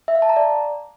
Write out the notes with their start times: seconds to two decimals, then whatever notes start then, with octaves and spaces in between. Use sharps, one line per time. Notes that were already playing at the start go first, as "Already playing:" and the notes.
0.08 E5
0.15 F5
0.22 A5
0.29 A#5
0.36 D5